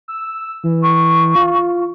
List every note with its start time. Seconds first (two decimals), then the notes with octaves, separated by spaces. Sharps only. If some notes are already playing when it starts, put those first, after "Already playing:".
0.08 E6
0.64 E3
0.82 C#6
1.36 F4